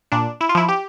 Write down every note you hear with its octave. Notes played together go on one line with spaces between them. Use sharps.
A#2 D4
E4
F4
F3 E4
G4